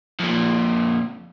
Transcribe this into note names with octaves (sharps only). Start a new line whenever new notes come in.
F2 A#2